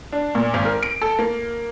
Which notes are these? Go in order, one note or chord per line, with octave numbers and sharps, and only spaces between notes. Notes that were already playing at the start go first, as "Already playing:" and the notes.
D4
A#2
G#1
A#4
D7
A4
A#3